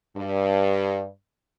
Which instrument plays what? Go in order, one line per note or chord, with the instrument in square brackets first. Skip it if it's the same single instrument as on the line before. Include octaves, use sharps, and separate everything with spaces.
[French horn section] G2